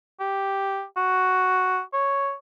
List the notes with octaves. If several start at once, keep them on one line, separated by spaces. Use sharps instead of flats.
G4
F#4
C#5